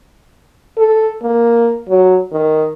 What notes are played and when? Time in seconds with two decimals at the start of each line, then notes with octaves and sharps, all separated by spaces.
0.78 A4
1.23 A#3
1.89 F#3
2.32 D#3